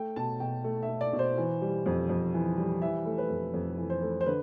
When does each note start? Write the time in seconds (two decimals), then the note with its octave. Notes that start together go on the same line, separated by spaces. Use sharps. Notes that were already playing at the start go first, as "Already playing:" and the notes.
Already playing: A3 G5
0.16 B2 A5
0.40 B2 G5
0.64 A3
0.83 E5
0.89 A3
1.01 D5
1.13 B2
1.19 C5
1.38 E3
1.62 G3
1.86 F2
2.09 F2
2.34 E3
2.57 G3
2.82 E3 E5
3.06 A3
3.18 B4
3.29 F2
3.54 F2
3.78 E3
3.90 C5
4.02 A3
4.21 C5
4.26 D3 B4